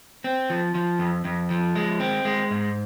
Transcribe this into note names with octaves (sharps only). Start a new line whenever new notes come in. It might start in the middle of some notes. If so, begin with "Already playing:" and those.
C4
F3
F3
F2
F2
F3
G#3
C4
G#3
G#2